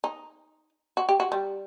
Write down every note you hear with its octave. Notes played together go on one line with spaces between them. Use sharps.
D#4
F#4
G4
F#4
G3